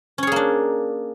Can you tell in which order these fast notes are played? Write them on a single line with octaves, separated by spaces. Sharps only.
C#4 C#5 G#4 A#3 D4